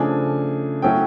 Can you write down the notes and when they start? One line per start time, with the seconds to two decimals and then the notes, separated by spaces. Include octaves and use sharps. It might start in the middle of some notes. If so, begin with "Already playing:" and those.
Already playing: C#3 F3 A3 D4 G#5
0.82 F#3 A3 C#4 E4 G5